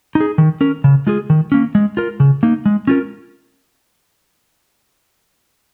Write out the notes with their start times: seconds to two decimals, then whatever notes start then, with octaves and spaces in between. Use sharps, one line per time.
0.15 D#4
0.20 G#4
0.38 D#3
0.61 C#4 A#4
0.84 C#3
1.07 G#3 F4 G#4
1.30 D#3
1.52 A#3 C#4
1.75 G#3
1.97 F4 A#4
2.20 C#3
2.43 A#3 D#4
2.66 G#3
2.87 C#4 F4 A#4